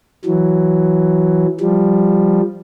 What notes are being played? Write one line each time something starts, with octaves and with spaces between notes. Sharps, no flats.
E3 F#3
F3 G3